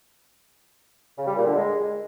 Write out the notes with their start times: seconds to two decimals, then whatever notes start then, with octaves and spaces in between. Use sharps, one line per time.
1.18 C#3
1.27 G3
1.37 A#2
1.46 D3
1.56 G#3